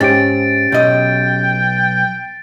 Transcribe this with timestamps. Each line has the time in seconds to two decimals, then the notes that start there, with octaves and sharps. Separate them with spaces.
0.01 G#2 C#4 G4 A6 D7
0.72 B1 D#5 G5